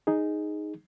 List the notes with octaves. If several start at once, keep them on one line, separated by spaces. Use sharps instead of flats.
D#4 G#4